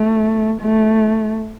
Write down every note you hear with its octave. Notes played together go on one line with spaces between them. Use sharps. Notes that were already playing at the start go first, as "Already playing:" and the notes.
Already playing: A3
A3